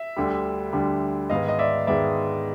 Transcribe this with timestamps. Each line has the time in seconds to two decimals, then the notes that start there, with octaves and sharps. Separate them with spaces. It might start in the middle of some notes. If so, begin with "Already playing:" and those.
Already playing: E5
0.16 D2 D3 G3
0.73 D2 D3 G3
1.30 G#2 D#3 G#3 B3 D#5 F5
1.48 D#5
1.59 D5 E5
1.87 G#2 D#3 G#3 B3 D5 E5